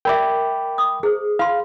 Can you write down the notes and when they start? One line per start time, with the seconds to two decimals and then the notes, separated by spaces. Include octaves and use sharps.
0.05 A#4 D5 E5 G5 B5 D6
0.78 D#6
1.03 G#4 C5
1.39 F4 F5 C6